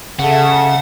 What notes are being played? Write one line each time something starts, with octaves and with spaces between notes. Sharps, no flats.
C#3 G#4 A4 E5 F#5